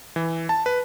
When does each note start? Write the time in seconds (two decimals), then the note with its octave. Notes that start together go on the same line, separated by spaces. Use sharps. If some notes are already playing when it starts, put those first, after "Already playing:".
0.16 E3
0.49 A5
0.66 B4